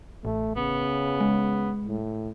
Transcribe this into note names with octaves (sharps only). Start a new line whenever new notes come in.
A1 A3
C#3 B3
G#3
A2